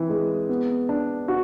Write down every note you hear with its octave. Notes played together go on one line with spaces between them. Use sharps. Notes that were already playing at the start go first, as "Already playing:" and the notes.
Already playing: E3 C4
G#3
B3
D4
F#4